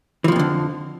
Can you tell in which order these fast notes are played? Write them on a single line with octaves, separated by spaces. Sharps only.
E3 F3 F2 B2 D3